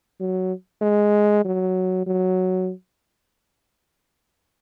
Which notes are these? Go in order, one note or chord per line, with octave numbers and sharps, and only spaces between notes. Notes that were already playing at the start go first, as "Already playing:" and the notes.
F#3
G#3
F#3
F#3